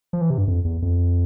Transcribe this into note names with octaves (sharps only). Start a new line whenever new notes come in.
F3
E3
C3
G2
F2
E2
F2